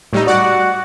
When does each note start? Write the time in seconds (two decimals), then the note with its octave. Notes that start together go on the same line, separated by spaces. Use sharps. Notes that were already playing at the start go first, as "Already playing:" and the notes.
0.13 A2 G3 D#4
0.27 F#4 D5 F#5